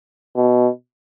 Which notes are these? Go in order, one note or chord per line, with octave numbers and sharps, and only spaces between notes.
B2